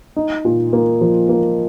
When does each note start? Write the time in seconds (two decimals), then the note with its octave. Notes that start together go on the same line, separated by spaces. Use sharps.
0.16 D#4
0.45 A#2
0.73 A#3
1.01 F3
1.29 A#3